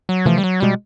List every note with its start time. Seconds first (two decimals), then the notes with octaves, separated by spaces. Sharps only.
0.09 F#3
0.25 C3 E3 F3 A3
0.38 G3
0.44 F#3
0.60 B2 G3 G#3